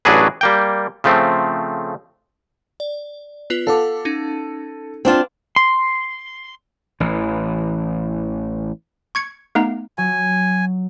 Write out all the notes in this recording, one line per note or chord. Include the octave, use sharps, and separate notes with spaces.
A1 F#3 D4 F#4 G#4 B4
G3 A#3 G5
C#3 F3 A3 C4
D5
B3 F4 B4
A4 F5 F#5 D6
C#4 D#4
C4 D4 F4
C6
A1 E3
C#6 G#6 C#7
A3 B3 D#4 F5 A#5
F#3 G#5